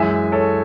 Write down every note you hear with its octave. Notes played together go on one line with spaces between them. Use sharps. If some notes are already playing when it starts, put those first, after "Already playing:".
Already playing: F#2 E3 G#3 E5 G#5
A4 C#5